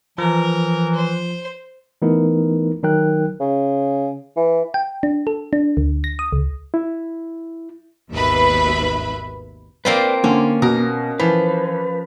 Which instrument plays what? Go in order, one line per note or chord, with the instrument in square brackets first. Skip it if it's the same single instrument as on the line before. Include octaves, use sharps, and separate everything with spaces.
[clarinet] E3 [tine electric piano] F3 [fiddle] A#4
[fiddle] C5
[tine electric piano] E3 A3 B3 D#4 E4 A#4
D#3 F#3 D#4 A#4 G5 F#6
[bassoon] C#3
E3
[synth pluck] G5
D4
A4
D4
D2
A#6
D#6
C#2
[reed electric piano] E4
[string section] G#1 D#2 B2 B4 E5 B5
[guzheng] A#3 C4 F4 [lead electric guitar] B4 D5
[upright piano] D3 [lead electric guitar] A#3 [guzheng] C#4
[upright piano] B2 [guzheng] A#4
[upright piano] E3 [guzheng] F3 [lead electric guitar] B4